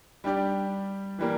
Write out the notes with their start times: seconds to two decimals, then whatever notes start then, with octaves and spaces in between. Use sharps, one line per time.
0.24 G3 D4 G4 D5
1.19 E3 G3 A#3